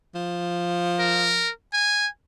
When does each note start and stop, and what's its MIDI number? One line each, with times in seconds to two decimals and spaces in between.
0.15 1.48 53
0.99 1.50 70
1.73 2.08 80